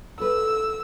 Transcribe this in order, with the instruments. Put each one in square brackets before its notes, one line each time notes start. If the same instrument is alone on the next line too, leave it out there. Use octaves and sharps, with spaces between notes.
[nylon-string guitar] A4 B4 [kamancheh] E6